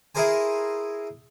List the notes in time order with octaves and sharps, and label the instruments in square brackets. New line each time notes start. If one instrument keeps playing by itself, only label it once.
[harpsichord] E4 G#4 A#4 C5 G#5